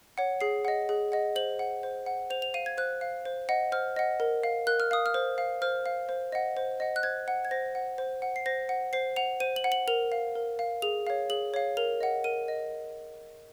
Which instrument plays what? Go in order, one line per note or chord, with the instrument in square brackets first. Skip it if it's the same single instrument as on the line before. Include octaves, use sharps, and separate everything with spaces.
[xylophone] C#5 F#5
G#4 C7
D#5 F#5
G#4
D#5 F#5
C5 F#7
F#5
C5
F#5
C5 F7
F7
F5 D#7
G#6
C5 F#6
F5
C5
D#5 F#5
C5 F6
D#5 F#5
A#4
F5
A#4 F#6
F6
F5 D#6
F6
C5
F5
C5 F6
F5
C5
D#5 F#5
C5
D#5 F#5
F#6
C5 G#6
F#5
G#6
C5 A#6
F#5
C5
F#5
C7
C5 A#6
F#5
C5 C7
F#5 F7
C5 D#7
F#7
F#5
F#7
A#4 F7
F5
A#4
F5
G#4 F7
C#5 F5
G#4 F#7
C#5 F5
A#4 F7
D#5 F#5
A#4 D#7
D#5